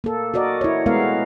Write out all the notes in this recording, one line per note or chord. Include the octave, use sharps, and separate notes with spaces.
A#3 A4
F#4 A#4 D5 D#5
E4 C#5
G#3 A3 B3 A#4 F5